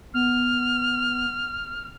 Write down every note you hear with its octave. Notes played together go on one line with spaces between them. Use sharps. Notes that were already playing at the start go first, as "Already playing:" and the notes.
B3 F6